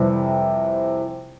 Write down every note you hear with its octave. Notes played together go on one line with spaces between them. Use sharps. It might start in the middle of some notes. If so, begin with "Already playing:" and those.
Already playing: F2 C3 E3 G3 C4